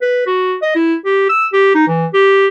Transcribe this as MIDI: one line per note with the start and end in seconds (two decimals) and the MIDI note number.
0.02 0.25 71
0.27 0.55 66
0.62 0.72 75
0.75 0.96 64
1.05 1.27 67
1.29 1.46 88
1.53 1.74 67
1.75 1.88 63
1.88 2.07 52
2.14 2.47 67